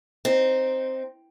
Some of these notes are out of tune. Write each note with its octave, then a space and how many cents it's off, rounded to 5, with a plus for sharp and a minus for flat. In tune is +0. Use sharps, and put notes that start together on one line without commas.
C4 +0 D#4 +0